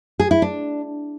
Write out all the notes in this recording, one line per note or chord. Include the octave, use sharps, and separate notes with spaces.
G#4
E4
D4